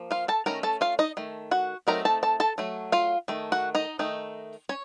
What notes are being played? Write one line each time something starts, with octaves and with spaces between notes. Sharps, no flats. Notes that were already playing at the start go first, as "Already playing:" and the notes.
Already playing: F3 A#3
F4 F5
A4 A5
D#3 A3 C#4 A#4 A#5
A4 A5
F4 F5
D#4 D#5
D#3 A3
F#4 F#5
F#3 A3 C4 D#4 A#4 A#5
A4 A5
A4 A5
A4 A5
F#3 A3
F4 F5
D#3 A3
F#4 F#5
D#4 D#5
D#3 A3 D#4
C#4 C#5